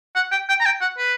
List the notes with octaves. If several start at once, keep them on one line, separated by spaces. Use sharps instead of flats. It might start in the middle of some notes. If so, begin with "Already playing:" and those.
F#5
G5
G5
A#5
G5
F#5
B4